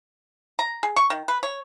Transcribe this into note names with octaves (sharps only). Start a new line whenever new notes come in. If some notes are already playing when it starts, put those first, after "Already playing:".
A#5
G#4
C#6
D#3
B4
C#5